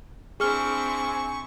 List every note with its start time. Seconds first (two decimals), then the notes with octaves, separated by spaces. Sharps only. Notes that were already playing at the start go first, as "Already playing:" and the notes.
0.40 C4 D4 E4 G#4 G#5 C#6 F6 G7